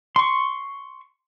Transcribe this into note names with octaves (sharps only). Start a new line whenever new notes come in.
C6 C#6